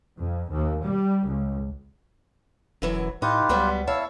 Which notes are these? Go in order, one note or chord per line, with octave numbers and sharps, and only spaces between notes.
F2
D#2
G3
C#2
E1 F#2 E3 F#3
A2 D#4 F4 G4 B4
C#2 F#3 G3 B3
E4 C#5 E5 F5 A5